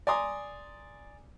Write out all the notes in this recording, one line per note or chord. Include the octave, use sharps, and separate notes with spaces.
D5 G#5 A#5 C6 D#6